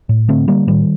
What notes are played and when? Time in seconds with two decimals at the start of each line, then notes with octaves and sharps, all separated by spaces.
0.09 A2
0.28 D3 A3 C4
0.48 D3 G3 A#3
0.67 A2 D#3 G3